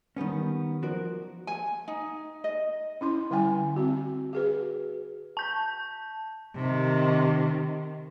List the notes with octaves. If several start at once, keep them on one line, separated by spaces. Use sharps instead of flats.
D#3 G3 B3 C#4
F3 F#4 A#4 D5
G#5
D#4
D#5
C#4 E4 C6
D3 G3 E4 G5 G#5
C4 F#4
F#4 G#4 B4
A5 G6
C3 D#3